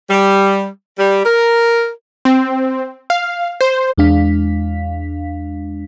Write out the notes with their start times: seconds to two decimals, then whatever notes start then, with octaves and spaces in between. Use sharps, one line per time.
0.09 G3
0.98 G3
1.24 A#4
2.25 C4
3.10 F5
3.61 C5
3.98 E2 G#3 D4 F5 B6